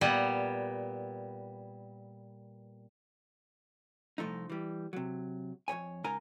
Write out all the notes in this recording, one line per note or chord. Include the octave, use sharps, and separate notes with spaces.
A#2 G3 B3
C2 F3 A3 D#4
E3 G3
C3 F#3
F2 G#2 C#5 G#5
C#2 D#4 A#4 G#5 A#5